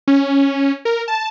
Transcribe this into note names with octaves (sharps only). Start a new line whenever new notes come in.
C#4
A#4
A5